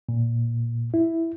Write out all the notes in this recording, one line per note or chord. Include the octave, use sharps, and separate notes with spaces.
A#2
E4